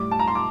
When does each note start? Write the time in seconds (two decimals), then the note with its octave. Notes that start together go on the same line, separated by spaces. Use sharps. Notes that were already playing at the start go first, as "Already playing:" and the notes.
Already playing: A2 G3 D6
0.11 A5
0.19 A#5
0.28 C6
0.35 D6